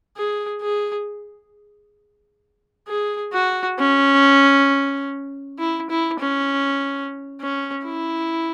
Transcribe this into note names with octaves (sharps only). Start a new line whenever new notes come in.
G#4
G#4
G#4
F#4
C#4
E4
E4
C#4
C#4
E4